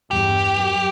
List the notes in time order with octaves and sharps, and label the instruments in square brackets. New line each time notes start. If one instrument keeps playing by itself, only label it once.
[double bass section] E2 G2 [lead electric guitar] G4
[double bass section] F#2